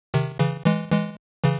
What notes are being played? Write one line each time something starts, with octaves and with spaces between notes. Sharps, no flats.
C3 D#3
C#3 E3
E3 G#3
E3 G#3
C#3 E3